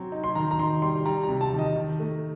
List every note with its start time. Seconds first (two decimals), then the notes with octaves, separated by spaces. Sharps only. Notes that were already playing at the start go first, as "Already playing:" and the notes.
Already playing: F#3 C4
0.12 D#4
0.24 C6
0.35 D#3 A#5
0.51 A#5
0.59 D#3 C6
0.82 G3 C6
1.05 G3 A#5
1.23 A#5
1.29 C3
1.41 A5
1.53 D#3
1.59 D#5
1.76 D#3
2.00 A3